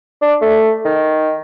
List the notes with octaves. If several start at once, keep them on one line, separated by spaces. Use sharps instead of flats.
D4
A3
D#3